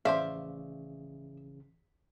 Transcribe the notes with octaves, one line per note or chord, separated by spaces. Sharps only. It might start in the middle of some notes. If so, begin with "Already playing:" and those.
A1 C#3 E3 C5 D5 E5 F5